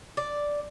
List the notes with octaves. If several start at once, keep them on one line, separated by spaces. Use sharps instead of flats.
D5